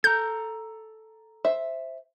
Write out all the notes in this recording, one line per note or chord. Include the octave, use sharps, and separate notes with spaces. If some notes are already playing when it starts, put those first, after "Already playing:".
A4 A#5 G6
C5 E5